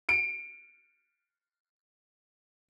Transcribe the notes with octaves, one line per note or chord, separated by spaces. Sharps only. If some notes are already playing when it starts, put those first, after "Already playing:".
C#7 D7